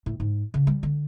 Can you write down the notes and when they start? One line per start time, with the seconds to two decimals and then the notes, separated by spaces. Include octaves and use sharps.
0.06 A2
0.20 G#2
0.54 C#3
0.67 G3
0.83 D3